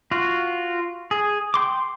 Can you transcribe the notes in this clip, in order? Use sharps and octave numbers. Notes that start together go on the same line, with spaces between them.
F4 F#4
G#4
G5 C6 D6